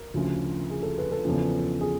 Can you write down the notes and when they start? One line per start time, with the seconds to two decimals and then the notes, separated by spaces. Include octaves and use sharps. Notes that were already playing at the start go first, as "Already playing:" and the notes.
Already playing: A#4
0.14 D2 C#3 F3
0.70 G#4
0.83 A4
0.98 B4
1.12 A4
1.25 E2 C#3 F3
1.81 G#4